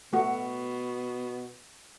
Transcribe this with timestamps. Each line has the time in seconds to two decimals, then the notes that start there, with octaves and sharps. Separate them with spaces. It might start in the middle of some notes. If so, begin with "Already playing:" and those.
0.13 B2 A3 F#4